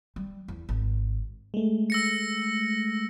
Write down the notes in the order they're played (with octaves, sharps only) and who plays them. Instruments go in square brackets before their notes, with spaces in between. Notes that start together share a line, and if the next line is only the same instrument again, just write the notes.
[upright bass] G3
E2
G#1
[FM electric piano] G#3 A3
[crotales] E6 A#6 C#7